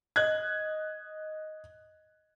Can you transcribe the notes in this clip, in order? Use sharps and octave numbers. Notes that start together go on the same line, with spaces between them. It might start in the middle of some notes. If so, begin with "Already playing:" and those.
D#5 F#6 G#6